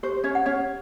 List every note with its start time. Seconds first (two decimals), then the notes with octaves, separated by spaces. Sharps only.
0.03 G4 C5
0.24 C#4 C#5
0.35 F#5
0.46 C#4 C#5